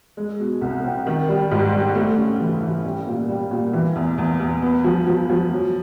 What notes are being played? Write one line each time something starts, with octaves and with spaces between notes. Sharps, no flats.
G#3
B2
C2
C4
D#3
G3
G#2
G3
A3
C#3
E3
E3
G3
A#2
G3
A#2
E3
E2
E2
E2
B3
F3
F3
F3
F#3